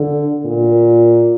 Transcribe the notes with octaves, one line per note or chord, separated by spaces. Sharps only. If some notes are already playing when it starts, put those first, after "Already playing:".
Already playing: D3
A#2